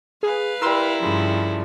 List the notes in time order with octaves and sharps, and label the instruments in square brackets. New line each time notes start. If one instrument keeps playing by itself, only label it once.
[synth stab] G#4 [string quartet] B4 F5
[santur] G3 A#4 [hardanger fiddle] E4 [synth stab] C6 E6
[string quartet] G2 C#3 F3